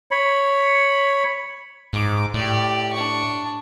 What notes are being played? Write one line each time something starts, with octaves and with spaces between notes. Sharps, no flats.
C#5 B5
G#2 D6
A2 G4 D5
D4 C#6